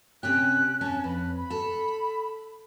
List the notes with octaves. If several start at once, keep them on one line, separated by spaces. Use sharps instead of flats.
C3 C#4 G4 F#6
F2 C#4 A5
F2 B4
B5
A4